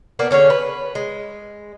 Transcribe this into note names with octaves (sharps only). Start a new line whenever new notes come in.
A#3 B3 D4
D3 C#4 G#4 C#5
B4
G#3